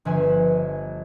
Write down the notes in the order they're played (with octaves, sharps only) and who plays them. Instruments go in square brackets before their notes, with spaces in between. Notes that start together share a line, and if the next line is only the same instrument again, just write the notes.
[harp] G1 F3 B4 E5 G#5